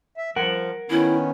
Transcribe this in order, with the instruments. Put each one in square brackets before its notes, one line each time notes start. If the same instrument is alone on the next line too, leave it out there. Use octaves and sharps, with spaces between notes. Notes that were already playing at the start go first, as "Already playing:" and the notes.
[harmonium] E5
[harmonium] F3 [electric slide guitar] A#4 F#5
[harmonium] D#3 B3 C#4 [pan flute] E4